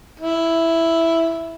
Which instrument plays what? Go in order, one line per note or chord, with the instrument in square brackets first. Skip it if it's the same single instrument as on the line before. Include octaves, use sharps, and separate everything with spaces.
[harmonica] E4